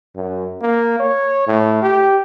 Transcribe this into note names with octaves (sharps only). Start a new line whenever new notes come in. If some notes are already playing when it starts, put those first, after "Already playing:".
F#2
A#3
C#5
A2
G4